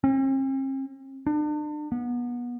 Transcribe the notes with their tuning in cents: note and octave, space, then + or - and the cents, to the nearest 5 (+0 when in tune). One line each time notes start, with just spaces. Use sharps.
C4 +45
D4 +40
B3 -30